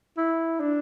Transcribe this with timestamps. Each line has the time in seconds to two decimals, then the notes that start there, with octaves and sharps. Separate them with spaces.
0.17 E4
0.60 D4